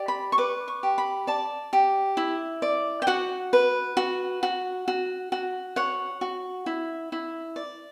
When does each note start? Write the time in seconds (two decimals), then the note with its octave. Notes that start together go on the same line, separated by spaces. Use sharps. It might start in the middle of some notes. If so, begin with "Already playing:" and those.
Already playing: G4 D5
0.08 B5
0.32 C#6
0.38 B4 D6
0.68 C#6
0.83 G4
0.98 B5
1.27 D5 A5
1.73 G4
2.17 E4
2.62 D5
3.02 G5
3.07 F#4 F#5
3.53 B4
3.97 F#4
4.43 F#4
4.88 F#4
5.32 F#4
5.76 C#5 F#5
6.21 F#4
6.66 E4
7.12 E4
7.56 D5